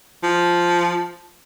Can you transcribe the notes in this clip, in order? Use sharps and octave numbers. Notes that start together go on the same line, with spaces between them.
F3